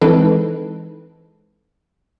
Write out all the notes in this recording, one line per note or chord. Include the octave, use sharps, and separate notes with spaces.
E3 G#3 C4 D#4 A4 B4